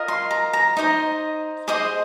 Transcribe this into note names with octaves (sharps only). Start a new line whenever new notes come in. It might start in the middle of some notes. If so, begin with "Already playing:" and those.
Already playing: F4 A#4 D#5
C6
A#5
A#5
D#4 C5 D#5
G#4 C5 D#5 C6